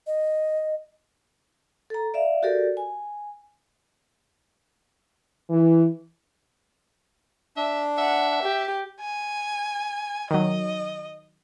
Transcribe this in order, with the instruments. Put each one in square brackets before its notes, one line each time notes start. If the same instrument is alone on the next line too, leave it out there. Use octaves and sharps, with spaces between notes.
[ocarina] D#5
[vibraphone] A4 A#5
D5 E5 F5
F#4 G4 A4 A#4 D5
G#5
[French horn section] E3
[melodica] D4 [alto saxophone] E5
[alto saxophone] E5 [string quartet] F#5
[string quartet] G4
[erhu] G#5
[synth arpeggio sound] D#3 F#3 [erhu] D#5